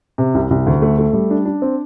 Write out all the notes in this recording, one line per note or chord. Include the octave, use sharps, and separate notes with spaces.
C3
C2
C2
D2
A3
A3
G3
D4
D4
C4